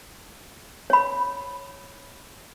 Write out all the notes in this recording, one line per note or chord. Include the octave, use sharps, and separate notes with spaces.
C#5 B5